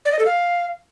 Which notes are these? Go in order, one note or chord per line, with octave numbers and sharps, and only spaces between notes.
D5
D#5
A4
F5